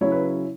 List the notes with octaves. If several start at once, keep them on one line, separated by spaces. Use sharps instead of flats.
C#3 F#3 C#4 E4 C#5
B4